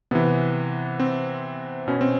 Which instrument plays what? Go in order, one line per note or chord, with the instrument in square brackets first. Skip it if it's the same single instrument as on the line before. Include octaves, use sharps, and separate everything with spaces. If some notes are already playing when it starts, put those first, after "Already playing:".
[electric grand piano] C3 E3 B3
C4
B2 C#4
C4